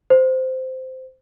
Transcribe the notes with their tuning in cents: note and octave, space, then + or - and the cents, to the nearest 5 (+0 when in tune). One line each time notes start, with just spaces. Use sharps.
C5 -10